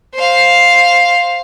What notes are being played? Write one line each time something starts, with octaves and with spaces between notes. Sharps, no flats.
C5 F5